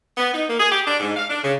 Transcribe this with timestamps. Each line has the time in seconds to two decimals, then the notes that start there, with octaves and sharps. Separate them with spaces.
0.17 B3
0.34 D#4
0.47 A#3
0.59 G#4
0.72 G4
0.87 D4
1.00 G#2
1.16 F5
1.29 D4
1.43 C#3